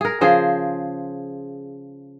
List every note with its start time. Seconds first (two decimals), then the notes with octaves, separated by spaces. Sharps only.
0.01 G#4 A#4
0.21 C#3 F3 G#4 C5